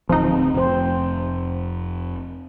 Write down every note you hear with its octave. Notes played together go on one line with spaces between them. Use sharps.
D1 F3 C4 D#4
F1 C4 C5